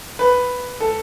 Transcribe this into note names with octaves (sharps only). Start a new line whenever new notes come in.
B4
A4